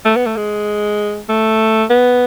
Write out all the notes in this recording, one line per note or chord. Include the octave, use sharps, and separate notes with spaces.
A3
B3
A3
G#3
A3
B3